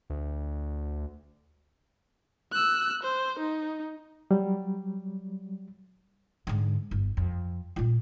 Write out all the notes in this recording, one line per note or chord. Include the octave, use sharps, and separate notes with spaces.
D2
E6 F#6
C5
D#4
F#3 G3
G#2 D3
G1
F2
A#2 F4